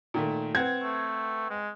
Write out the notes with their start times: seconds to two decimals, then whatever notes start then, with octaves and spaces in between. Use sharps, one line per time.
0.14 A#2 D#3 A3
0.55 C4 B4 F#5 G#6
0.83 A3
1.50 G#3